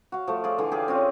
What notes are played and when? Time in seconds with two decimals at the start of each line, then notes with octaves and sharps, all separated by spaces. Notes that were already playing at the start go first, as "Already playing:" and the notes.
0.12 F#4 F5
0.28 F3 A3
0.44 F4 G#4 D5
0.58 D3 E3 F4
0.72 G4 G#4 F5
0.88 C4 C#4 F4